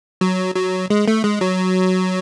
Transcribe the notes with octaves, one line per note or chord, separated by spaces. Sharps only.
F#3
F#3
G#3
A3
G#3
F#3